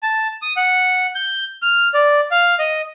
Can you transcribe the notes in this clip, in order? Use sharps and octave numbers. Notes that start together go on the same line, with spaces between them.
A5
D#6
F#5
G6
F6
D5
F5
D#5